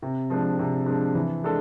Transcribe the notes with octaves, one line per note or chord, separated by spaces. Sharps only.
C3
F3 G#3 D4
C3
F3 G#3 D4
E3
G#3 D4 A4